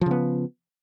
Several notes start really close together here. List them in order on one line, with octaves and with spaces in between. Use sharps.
F3 C#3 B3